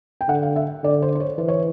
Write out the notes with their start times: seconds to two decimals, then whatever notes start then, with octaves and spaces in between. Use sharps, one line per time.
0.21 G5
0.29 D3 F#5
0.43 F5
0.56 E5
0.84 D3 D5
1.02 C5
1.15 C5
1.20 C#5
1.38 E3 C5
1.48 C#5